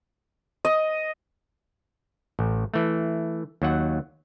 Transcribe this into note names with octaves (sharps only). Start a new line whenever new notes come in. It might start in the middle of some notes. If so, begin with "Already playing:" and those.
D#5
A1
E3 A3
D#2 F#3 F#5